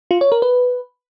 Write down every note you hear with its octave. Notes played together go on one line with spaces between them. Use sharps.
F4
C#5
A#4
B4